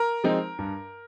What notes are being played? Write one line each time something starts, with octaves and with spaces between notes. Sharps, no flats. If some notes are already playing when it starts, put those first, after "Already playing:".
Already playing: A#4
F3 G#3 C4 D#4
G2